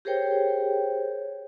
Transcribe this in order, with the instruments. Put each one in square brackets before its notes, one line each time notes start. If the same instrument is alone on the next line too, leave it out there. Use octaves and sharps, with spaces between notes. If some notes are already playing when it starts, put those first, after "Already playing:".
[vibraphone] G4 G#4 A#4 C5 C#5 G5